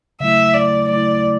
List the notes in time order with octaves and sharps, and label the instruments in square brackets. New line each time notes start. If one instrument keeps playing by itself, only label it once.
[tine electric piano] C#3 F#3 A3 E4 [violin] E5
[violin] D5
[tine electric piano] C#3 F#3 A3 E4 [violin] D5